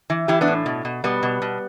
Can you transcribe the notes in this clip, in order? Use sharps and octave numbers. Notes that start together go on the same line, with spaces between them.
E3
E3 E4 G4
B3 D4
A2
B2
B2
B2 G3 B3
B2
B2